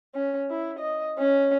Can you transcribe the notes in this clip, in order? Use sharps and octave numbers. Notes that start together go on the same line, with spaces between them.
C#4
E4
D#5
C#4